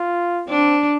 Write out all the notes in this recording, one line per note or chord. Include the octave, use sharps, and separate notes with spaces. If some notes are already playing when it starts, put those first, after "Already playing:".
Already playing: F4
C4 D4